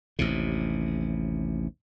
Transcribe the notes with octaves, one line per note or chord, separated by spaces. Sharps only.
A1 D#2 C3